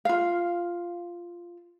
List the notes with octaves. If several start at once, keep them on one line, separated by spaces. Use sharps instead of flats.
F4 F5